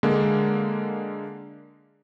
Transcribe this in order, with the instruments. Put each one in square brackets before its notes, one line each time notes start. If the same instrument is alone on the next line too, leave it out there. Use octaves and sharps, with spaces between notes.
[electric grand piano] D3 G#3 A#3